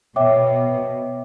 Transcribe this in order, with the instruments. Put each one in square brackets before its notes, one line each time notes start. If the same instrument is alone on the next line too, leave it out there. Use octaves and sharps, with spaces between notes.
[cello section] B2 [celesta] C#5 E5 G5 D6